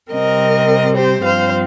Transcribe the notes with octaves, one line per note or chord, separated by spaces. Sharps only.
C3 G3 C4 A#4 D#5
G4 C5
G2 F3 C4 C5 F5